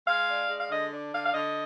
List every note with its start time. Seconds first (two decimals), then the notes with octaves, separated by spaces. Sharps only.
0.06 G#3 F5
0.28 D4
0.49 G#3
0.59 F5
0.70 D3 D#5
0.92 D4
1.13 D3 F5
1.25 F5
1.33 D3 D#5